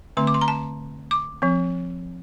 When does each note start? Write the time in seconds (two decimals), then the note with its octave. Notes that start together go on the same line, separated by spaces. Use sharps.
0.17 D3 A3 C4 C6
0.27 D6
0.34 C6
0.41 A#5
0.48 A5
1.11 D6
1.42 F3 C4